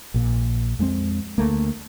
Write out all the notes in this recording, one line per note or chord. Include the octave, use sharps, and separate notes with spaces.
A#1 A#2
F2 G#3 A#3 C4
D2 A3 A#3